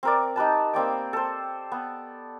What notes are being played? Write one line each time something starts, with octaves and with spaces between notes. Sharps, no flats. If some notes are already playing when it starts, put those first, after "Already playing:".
C4 A#4 D5
D#4 G4 B4 A5
A#3 C4 D5 G5
A4 C5
B3